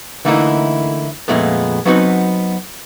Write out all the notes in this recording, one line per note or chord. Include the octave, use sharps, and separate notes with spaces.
D3 E3 A3 A#3 D#4 E4
F2 A#2 G#3 A3 B3
F#3 B3 C4 D#4 F#4 B4